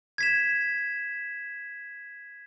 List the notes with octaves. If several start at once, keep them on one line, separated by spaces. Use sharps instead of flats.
G#6 B6 E7